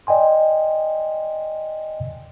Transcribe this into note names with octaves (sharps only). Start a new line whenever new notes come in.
D5 D#5 G5 G#5 C6